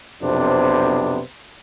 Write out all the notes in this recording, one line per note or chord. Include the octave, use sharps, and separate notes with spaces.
B1 F2 C3 B3 D4 C5